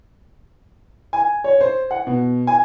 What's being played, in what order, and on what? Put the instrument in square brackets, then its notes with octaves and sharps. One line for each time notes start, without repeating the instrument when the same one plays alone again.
[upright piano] G#5
C#5
C5
F#5
B2
G#5